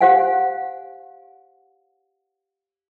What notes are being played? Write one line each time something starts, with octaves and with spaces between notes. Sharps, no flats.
G4 C5 F5 F#5 G#5